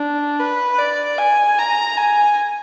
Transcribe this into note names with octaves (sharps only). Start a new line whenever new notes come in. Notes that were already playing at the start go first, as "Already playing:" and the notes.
Already playing: D4
B4
D5
G#5
A#5
G#5